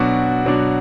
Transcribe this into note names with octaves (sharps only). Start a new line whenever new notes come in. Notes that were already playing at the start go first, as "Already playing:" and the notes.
Already playing: B2 F#3 D4 F#4
B2 F#3 D4